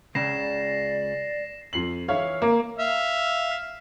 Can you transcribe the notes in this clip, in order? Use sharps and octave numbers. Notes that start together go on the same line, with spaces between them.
C#2 C#3 D5 A#6 C7 E7
F2 C7 F#7
E3 E4 C#5 F5
A#3
E5 F5